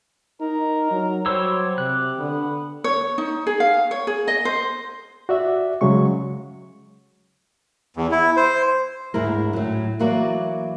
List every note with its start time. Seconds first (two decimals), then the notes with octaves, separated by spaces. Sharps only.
0.41 D#4 A#4
0.91 F#3
1.26 F#3 G3 C5 C#5 E6
1.78 C3 G4 F#6
2.19 D3 B3
2.84 C#5
3.18 D#4
3.47 G#4
3.60 F5
3.91 C#5
4.07 G#4
4.28 D#5
4.45 C5
5.29 F#4 D5 E5
5.81 C#3 F#3 G#3 C#6
7.97 E2
8.11 E4
8.37 C5
9.14 D2 G#2 E4 A#4
9.53 A2 F#3
9.99 E3 F#3 A#3 F#4 A#4 D5